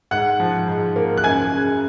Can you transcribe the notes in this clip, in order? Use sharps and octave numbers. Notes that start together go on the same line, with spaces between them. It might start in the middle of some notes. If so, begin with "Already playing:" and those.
G#2 F#5 F#6
F3
G#2
A#3
F#6
F#2 G#5 G#6
C#3